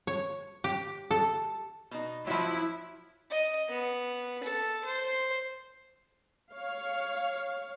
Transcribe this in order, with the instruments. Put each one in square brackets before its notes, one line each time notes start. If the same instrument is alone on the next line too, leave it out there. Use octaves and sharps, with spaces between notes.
[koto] C#5
G4
A4
[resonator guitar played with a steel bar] B2 D#4
[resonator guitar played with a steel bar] F3 F#3 [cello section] E4
[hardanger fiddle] D#5
B3
A4
C5
[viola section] C#5 F5